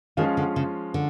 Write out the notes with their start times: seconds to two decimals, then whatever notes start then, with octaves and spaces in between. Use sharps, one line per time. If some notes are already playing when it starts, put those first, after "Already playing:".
0.17 D#3 F3 G#3 C#4 F4
0.37 D3
0.56 C#3
0.94 D3